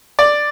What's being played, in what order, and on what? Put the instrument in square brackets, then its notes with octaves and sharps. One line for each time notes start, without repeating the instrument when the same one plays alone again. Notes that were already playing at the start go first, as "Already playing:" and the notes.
[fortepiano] D5